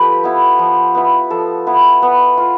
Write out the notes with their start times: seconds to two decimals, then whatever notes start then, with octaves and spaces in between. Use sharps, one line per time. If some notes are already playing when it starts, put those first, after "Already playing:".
Already playing: F3 G4 A4 B4
0.24 B3 E4
0.59 F3
0.95 B3 E4
1.30 F3 A4
1.67 B3 E4
2.02 B3
2.37 F4